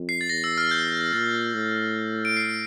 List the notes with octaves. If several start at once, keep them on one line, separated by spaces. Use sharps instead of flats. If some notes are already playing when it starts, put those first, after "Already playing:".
Already playing: F2
C7
A6
E2 A#6
E6
F6
G6
A#2 A6
A2
D7
C7